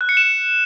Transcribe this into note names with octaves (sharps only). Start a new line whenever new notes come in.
F#6
C#7
E7